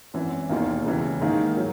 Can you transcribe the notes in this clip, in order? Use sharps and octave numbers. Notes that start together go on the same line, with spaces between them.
G#1 F#2 E3
E1 D#2 D#3 A#3
C#2 C#3 E3 G#3
G#2 D#3 A#3 D#4
F#3